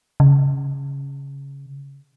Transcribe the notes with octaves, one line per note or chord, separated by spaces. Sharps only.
C#3